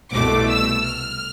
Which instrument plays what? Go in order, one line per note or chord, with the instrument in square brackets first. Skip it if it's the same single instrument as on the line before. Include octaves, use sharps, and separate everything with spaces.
[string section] C2 B2 A3 D6
E6
F6